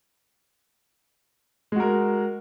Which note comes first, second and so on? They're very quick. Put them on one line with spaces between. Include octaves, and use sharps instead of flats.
G#3 F#4 A#4